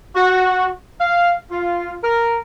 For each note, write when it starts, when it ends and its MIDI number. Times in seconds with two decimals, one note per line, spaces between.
0.15 0.68 66
1.00 1.32 77
1.51 1.95 65
2.04 2.38 70